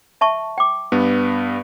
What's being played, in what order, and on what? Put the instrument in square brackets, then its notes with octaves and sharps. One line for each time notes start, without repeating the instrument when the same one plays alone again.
[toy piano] E5 A5 C#6
G5 D6
[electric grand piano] G2 B3